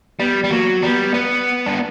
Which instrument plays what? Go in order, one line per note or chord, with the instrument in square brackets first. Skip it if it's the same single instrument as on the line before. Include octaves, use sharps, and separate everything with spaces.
[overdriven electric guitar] G3 [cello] B3
[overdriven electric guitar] G3
[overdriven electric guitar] F#3 [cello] A#3
[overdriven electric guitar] G3 [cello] B3
[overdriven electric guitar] B3
D4